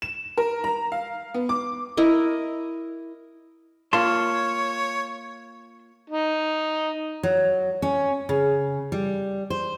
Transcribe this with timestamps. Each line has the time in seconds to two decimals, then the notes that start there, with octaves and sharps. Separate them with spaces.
0.02 E7
0.37 A#4
0.64 A#5
0.92 F5
1.34 B3
1.49 D6
1.97 E4 A#4 D#5
3.93 A#3 F4 C#5 A5 C6
6.10 D#4
7.23 F#3
7.82 C#4
8.29 C#3
8.92 G3
9.50 C5